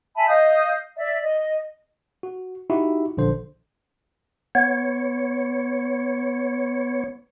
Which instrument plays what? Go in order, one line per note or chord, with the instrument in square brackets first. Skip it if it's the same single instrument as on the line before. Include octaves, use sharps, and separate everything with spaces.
[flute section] E5 G#5 A5 B5
D#5 F5 D#6 G6
D5 E5
D#5
[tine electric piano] F#4
D#4 E4 F#4 G4 E5
A#1 D3 C5
[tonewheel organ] B3 C#5